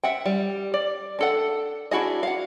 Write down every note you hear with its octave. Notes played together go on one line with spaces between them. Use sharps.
E5 F#5 G5
G3
D5
D4 A4 F#5
D4 E4 F#4 G#4 D#5
F5 F#5